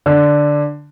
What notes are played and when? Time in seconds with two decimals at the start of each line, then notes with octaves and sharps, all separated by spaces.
0.06 D3